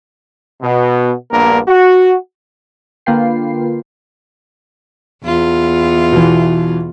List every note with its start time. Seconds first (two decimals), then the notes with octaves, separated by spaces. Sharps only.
0.62 B2
1.32 A#1 G2 A#3 B3 A#4
1.68 F#4
3.06 D3 A#3 F4 B4 G5 C7
5.24 E2 F4
6.12 B2 E3